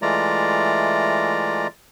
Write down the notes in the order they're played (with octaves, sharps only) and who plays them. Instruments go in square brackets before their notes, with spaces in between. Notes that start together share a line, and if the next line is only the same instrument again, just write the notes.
[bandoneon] E3 G#3 A3 F4 D5 A#5